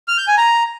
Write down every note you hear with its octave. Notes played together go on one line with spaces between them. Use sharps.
F6
G6
G#5
A#5